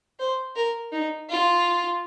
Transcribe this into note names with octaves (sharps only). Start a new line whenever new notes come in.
C5
A#4
D#4
F4